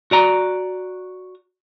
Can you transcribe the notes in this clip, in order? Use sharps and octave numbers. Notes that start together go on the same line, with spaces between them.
F#4 D5 A#5